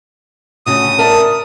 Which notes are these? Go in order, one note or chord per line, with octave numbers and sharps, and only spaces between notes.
D2 C#3 F#4 D#6
A#4 D5 E5 A5